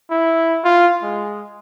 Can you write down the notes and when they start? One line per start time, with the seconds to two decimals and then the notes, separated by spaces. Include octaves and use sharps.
0.11 E4
0.64 F4
1.03 G#3